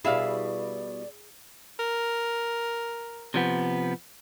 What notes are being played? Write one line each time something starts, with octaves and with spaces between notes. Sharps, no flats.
B2 G3 E4 G#4 D5 E5 F5
A#4
C3 F3 B3